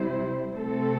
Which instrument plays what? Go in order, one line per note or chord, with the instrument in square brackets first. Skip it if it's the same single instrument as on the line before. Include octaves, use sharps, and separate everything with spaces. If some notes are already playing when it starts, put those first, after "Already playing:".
Already playing: [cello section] C3 G3 E4 C5
C3 A3 C4 A4